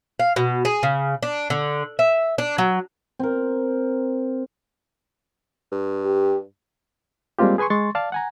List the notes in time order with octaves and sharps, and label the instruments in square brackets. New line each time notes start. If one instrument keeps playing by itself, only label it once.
[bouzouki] F5
B2
G#4
C#3
D4
D3
E5
D4
F#3
[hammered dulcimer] C4 A#4
[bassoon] G2
[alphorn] G4
[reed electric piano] G3 G#3 A#3 C4 F4 G4
G#4 B4 G#5 C6 C#6
G#3 C6 C#6 A6
D5 F5 A5
F#5 G#5 A#5